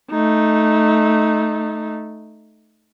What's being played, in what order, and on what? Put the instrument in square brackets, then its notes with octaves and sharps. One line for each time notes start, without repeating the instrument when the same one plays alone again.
[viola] A3 D#4